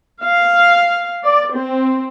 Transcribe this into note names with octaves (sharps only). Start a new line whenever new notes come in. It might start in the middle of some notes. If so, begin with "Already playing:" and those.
F5
D5
C4